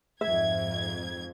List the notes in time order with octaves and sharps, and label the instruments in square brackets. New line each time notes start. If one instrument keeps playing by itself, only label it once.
[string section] F2 G#2 G#6 [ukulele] E5